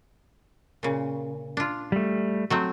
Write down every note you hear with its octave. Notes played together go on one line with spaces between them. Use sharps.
A#2 C#3
D4 F4
G3 A3
F#3 A3 C4